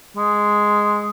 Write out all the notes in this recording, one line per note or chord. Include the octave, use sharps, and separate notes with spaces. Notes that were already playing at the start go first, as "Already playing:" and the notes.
G#3